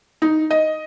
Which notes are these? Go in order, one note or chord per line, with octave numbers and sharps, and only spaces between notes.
D#4
D#5